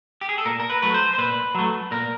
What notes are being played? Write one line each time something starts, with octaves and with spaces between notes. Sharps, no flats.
G4
G#4
A4
A#2 A#4
A#4
B4
F#3 A3 B4
C5
C5
A#2 B4
F#3 A3
A#2 A#4